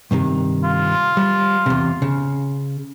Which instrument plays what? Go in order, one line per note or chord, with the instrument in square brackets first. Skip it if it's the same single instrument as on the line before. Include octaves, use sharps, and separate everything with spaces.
[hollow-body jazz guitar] G2 C3 D#3
[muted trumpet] F4
[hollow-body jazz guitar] G3
E2 C3
C#3